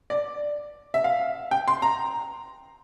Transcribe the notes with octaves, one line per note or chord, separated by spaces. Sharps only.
D5
E5
F5
G5
C6
A#5